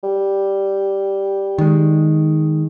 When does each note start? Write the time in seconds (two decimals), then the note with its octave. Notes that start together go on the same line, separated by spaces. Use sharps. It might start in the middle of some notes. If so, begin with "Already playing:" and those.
0.04 G3
1.58 D#3 G#3